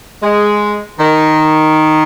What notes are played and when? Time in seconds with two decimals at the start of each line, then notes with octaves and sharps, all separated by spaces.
0.22 G#3
0.99 D#3